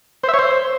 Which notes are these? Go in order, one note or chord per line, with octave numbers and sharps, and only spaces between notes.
C5
E5
C#5
C5